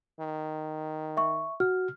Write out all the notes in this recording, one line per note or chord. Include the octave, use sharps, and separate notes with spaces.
D#3
E5 C#6
F#4 F6